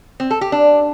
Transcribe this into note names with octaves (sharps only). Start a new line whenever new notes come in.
C4
A4
G4
D4